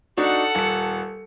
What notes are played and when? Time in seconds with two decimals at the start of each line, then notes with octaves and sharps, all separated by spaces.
0.17 D4 D#4 F#4 A4 F#5
0.55 D#1 C#7